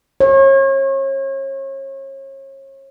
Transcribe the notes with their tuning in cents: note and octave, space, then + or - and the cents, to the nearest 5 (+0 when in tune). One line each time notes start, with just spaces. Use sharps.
C#5 -35